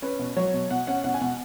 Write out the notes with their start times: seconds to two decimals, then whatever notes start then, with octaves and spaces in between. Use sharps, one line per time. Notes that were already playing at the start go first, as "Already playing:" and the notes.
0.02 C#4 B4
0.19 B2
0.36 F#3 C#5
0.54 B2
0.70 B2 F#5
0.87 C#4 F#5
1.04 B2 F#5
1.14 G#5
1.21 B2 F#5